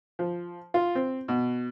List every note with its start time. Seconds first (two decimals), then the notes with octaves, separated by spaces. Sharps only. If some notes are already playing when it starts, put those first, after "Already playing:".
0.19 F3
0.74 F4
0.95 C4
1.28 B2